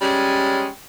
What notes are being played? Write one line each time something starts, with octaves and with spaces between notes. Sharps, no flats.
G3 G#3 C#4